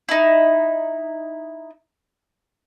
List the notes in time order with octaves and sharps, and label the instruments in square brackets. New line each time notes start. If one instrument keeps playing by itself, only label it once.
[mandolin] D#4 E4